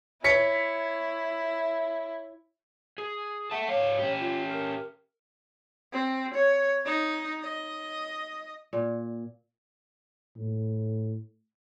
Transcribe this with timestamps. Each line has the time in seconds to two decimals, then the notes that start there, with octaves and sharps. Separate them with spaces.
0.24 E4 C#5 B6 C#7
2.98 G#4
3.51 A4 E5 F#5 A5
3.69 G#2 C#5 F5
3.99 C#4 G4
4.19 F4
4.47 A#4
5.93 C4
6.34 C#5
6.86 D#4
7.42 D#5
8.73 A#2
10.37 A2